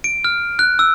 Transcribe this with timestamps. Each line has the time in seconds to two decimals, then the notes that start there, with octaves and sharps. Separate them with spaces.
0.04 D7
0.24 F6
0.59 F#6
0.79 E6